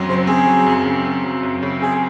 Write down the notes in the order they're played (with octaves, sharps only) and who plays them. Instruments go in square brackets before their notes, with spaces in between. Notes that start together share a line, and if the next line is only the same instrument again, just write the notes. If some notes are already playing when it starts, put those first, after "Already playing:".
Already playing: [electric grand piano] F#2 F#3 C4
[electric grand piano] C#3 [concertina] C5
[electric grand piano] C4 [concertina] G#4
[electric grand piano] F#3
F#2
C#3
C4
F#3
F#2
C#3
[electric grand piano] C4 [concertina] G#4